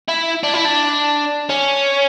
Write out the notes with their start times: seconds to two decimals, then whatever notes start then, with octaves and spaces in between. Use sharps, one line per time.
0.09 E4
0.43 D4
0.54 E4
0.65 D4
1.49 C#4